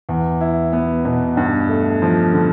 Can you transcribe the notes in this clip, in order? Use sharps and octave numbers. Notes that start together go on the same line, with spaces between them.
E2
E4
B3
B2
G2
A3
F3
D3